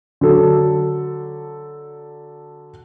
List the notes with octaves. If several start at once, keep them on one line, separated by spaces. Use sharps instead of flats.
D3 F#3 A4